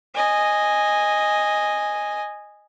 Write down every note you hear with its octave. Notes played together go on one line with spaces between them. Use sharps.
D#5 G#5